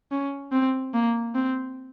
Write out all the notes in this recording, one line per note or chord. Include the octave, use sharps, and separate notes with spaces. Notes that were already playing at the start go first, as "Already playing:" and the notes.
C#4
C4
A#3
C4